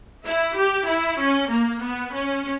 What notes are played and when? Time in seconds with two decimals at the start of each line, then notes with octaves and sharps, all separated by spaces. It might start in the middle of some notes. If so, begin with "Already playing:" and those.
0.25 E4
0.56 G4
0.87 E4
1.19 C#4
1.50 A#3
1.82 B3
2.14 C#4